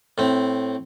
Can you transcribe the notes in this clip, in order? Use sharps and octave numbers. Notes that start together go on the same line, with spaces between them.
A2 C4